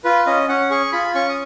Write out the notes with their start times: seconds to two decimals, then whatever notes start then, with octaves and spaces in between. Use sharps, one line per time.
0.04 F4 B4
0.27 C#4 D#5
0.49 C#4 F#5
0.70 G#4 C#6
0.92 F4 B5
1.15 C#4 C#6
1.29 D#6